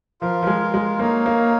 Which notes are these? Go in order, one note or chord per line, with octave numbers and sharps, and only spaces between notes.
F3 F4 A#4 F5
F3
G#3
G#3
A#3 D#4 C#5 F5
A#3